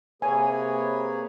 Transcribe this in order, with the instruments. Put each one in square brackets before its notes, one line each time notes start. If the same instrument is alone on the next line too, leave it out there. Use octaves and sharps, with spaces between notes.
[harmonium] C3 A#3 G#4 [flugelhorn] B4 [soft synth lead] C#5 [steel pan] G#5